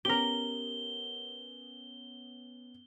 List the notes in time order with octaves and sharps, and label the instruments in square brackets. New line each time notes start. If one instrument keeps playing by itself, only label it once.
[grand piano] B3 C#4 [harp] G4 A#4 [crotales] G7